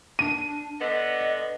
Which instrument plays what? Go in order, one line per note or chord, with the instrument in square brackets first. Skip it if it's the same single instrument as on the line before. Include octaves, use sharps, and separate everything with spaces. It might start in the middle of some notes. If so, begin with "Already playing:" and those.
[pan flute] D4 [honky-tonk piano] D#7
[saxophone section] D3 B3 [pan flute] D#5